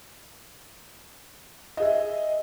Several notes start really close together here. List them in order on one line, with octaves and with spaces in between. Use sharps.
D#5 G#4 E5